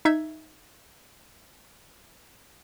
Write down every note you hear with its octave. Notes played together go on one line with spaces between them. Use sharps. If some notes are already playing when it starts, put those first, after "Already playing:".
D#4 E5 G#6